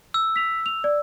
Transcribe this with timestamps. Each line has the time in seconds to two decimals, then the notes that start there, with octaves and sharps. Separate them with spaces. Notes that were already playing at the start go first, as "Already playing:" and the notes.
0.14 E6
0.36 B6 F7
0.66 F7
0.84 D5